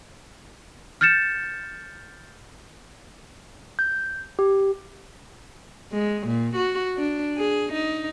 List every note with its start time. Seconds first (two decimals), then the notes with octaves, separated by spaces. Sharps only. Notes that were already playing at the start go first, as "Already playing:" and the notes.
1.01 F6 G6 A6 C#7 E7
3.79 G6
4.39 G4
5.92 G#3
6.27 A#2
6.56 F#4
6.97 D4
7.37 G#4
7.73 D#4